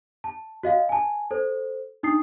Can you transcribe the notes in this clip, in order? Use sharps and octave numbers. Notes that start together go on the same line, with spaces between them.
A5
F#4 D#5 F5
G#5 A5
A4 C5
D4 D#4 D#6 C7